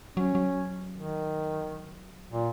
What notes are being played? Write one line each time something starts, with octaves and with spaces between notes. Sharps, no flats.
F#3 C#4
F#3
D#3
A#2